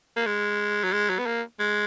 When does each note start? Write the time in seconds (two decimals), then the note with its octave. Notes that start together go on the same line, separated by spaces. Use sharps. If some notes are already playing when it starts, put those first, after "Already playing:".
0.17 A#3
0.26 G#3
0.84 F#3
0.93 G#3
1.10 F#3
1.19 B3
1.26 A#3
1.60 G#3